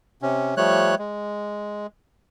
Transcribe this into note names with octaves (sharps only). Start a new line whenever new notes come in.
C3 C#4
F3 G3 A3 C#5 F#6
G#3